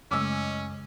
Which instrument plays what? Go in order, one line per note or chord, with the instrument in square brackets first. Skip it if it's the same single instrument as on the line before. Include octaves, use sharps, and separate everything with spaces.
[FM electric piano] F#2 A3 D#5 [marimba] C#3 G#3 [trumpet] C#4 [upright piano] D6 E6